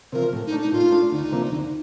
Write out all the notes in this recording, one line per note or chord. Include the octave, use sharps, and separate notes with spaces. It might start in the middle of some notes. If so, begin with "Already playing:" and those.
C3 F3 A#4
A2
D#4
A3 D4
D#4
A2 F4
A3 D4
D2 D#4
C3 F3 A#3 D4
D2